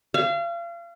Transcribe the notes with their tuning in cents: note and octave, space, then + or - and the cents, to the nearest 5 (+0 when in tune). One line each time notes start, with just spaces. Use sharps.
F5 -35